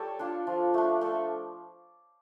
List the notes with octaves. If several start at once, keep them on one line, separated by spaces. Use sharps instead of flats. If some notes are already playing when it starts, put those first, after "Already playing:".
Already playing: G3 A4 C#5
D4 F4
F3
A3 D4
A3 A4